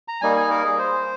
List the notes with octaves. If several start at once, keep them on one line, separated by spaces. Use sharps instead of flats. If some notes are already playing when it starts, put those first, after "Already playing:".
A#5
G3 A#3 D#4 G#5
G#5
A#4
G#4
C5